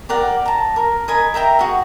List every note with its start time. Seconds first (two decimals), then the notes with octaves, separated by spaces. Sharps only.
0.09 G4 A#4 D5 F#5
0.46 A5 A#5
0.76 A#4
1.08 A#4 D#5 G#5 B5
1.34 A#4 E5 G5 A#5
1.59 F#4 G#4